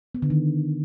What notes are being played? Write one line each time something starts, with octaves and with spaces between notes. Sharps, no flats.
B3
D3
D#3